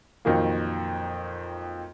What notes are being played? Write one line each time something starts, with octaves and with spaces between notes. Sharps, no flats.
F2 A#2 D#3 F#3 A#3